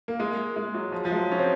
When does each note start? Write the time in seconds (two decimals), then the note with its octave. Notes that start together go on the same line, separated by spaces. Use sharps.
0.08 A#3
0.20 G#3
0.56 G#3
0.74 F#3
0.92 F3
1.05 F3
1.12 G#3
1.16 F#3
1.32 C#4
1.39 C4